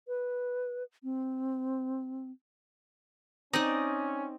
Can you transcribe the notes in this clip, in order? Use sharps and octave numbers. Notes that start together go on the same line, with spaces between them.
B4
C4
C4 C#4 D#4 D5 D#5